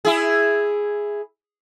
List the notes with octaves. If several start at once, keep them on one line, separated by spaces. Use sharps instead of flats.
E4 G#4